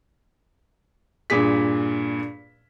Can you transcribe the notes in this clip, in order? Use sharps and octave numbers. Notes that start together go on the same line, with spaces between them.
G2 A#2 G#4 B6